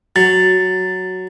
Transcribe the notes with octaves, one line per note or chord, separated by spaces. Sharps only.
F#3 A6